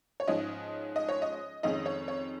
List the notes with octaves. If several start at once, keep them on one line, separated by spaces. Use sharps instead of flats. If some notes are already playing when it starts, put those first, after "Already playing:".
C#5
G#2 F3 C#4 D#5
D#5
C#5
D#5
F2 D#3 G#3 C#4 D#5
C#5
C#5